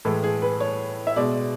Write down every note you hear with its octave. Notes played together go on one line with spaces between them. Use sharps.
A2 E3 G#3 A4
G#4
B4
C#5
E5
B2 G#3 D5